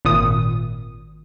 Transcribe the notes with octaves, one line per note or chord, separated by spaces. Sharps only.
G#1 A#2 D#6